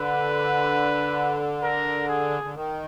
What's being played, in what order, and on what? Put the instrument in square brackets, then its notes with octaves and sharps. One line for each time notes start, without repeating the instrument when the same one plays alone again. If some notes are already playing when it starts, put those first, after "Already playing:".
Already playing: [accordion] D3 [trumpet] B4
[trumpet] A#4
G#4
[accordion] D3
D#3